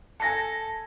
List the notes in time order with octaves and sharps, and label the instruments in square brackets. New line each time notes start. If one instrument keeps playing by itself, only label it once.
[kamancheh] A4 [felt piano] G#5 A#6 C#7 [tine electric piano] A5